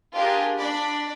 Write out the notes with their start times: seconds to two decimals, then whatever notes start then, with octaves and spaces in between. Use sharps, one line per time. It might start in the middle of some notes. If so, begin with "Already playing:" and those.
0.14 D4 F4 G4 G#4 A#4
0.56 D4 D5 B5